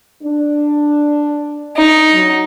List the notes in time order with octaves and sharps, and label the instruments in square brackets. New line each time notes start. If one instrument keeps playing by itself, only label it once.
[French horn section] D4
[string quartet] D#4
[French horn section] F#3